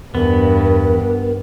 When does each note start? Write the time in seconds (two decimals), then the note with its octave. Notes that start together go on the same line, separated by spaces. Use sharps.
0.15 E2 G2 B3 A#4